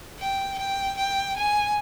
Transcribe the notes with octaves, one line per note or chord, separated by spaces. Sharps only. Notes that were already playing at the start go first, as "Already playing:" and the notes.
G5
G5
G5
G#5